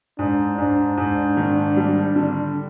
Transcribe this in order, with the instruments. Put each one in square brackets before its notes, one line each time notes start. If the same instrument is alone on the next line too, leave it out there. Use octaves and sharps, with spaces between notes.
[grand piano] G#2 [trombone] D4
[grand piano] G#2 [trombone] D4
[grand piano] G#2
D#3
G3
D3